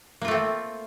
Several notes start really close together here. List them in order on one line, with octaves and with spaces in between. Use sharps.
A#3 F4 A3 C4